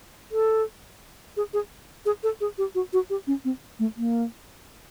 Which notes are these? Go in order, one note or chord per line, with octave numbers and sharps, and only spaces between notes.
A4
G#4
G#4
G#4
A4
G#4
G4
F#4
F#4
G4
C#4
C4
A3
A#3